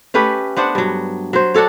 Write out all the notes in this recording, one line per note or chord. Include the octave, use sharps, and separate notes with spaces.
A3 C#4 G4 B4
B3 D4 C5 F#5
G2 F#3
F#3 C5
D4 F#4 A4 C#5